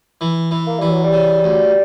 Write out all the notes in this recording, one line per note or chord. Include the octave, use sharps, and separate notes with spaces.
E3
E3
A#3
E3 G3
F#3
G3
C#3
D2